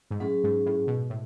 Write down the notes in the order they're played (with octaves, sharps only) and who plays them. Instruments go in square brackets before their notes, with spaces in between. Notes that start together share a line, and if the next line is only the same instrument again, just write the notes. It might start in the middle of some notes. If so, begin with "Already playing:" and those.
[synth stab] G#2
[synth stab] A2 [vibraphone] F#3 C#4 G#4
[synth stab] G#2
A2
B2
A2